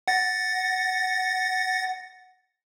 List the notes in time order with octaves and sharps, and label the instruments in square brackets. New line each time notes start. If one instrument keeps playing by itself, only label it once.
[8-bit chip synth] F#5 A6 A#6